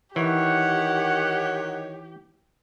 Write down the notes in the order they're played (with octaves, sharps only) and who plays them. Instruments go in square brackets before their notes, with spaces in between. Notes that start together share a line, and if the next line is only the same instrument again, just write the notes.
[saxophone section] D#3 C#5 [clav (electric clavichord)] E3 [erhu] G4 [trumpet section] F#5